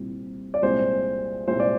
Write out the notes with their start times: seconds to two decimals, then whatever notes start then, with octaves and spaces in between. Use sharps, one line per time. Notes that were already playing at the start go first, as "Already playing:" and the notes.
Already playing: C2 A#2 G3 C4
0.54 D5
0.62 C2 A#2 G#3 C4 C5
1.47 C2 A#2 G#3 C4 C5
1.60 D5